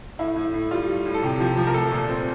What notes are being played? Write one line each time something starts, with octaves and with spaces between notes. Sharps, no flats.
A2 E4
A2
A2
G3 F4
G3
A2
A4
C3 G4
F3
F3
A#4
A3 A4
A#2
C4